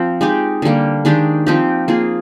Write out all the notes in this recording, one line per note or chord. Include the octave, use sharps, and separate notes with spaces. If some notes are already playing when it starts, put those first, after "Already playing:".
Already playing: F3 C4
G#3 D#4 G4
D3 G3 A#3
D#3 G#3 D4 G4
F3 C4 D#4 G4
A#3 F4 G#4